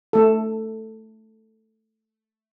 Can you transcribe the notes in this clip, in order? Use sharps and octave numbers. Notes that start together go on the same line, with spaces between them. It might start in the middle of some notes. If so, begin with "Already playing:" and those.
A3 A4